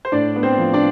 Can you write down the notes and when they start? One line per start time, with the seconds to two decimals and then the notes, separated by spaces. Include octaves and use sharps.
0.05 C5
0.12 A2 D4 D5
0.36 B3
0.43 C4 C5
0.58 F3
0.73 D4 D5